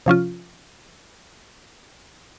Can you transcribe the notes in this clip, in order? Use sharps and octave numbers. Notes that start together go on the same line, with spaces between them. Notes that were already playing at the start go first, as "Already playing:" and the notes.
C3 F3 C#4 F4